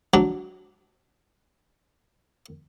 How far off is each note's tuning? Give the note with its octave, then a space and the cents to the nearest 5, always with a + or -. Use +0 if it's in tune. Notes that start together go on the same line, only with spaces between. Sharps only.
F#3 +0 D4 -15